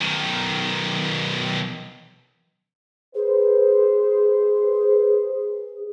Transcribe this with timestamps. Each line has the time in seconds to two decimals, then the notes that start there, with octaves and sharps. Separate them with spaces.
0.01 B1 D#3
3.15 G#4 B4 C5